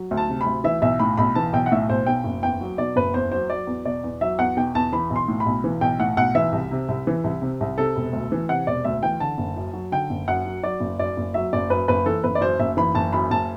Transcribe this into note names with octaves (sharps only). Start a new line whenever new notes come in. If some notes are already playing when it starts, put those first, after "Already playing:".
Already playing: F#3
D2
A5
C3
B5
D2
E3 E5
B1 E5
A2 B5
B1 B5
E3 A5
B1 G5
F#5
A2 E5
B1 C5
B2 G5
F#1
E2 G5
F#3
B2 D5
F#1 B4
E2 C5
F#3 C5
F#3 D5
E2
B2 D5
E2
F#3 E5
E2 F#5
B2 G5
E2 A5
E3 B5
B1
C6
A2
B5
B1
E3
B1 G5
A2 F#5
B1 F#5
E3 E5
C2
C3
C2
E3
C2
C3
C2
C3 A4
E1
D2
E3
C3 F#5
E1 D5
D2 E5
E3 G5
D3 A5
F#1
F#2
F#3
D3 G5
F#1
F#2 F#5
F#3
F#3 D5
F#1
F#2 D5
F#1
F#3 E5
F#1 D5
F#2 B4
F#1 B4
E3 A4
F#1 B4
D5
F#2 C5
F#1 E5
E3 B5
F#1 A5
F#2 B5
F#1 A5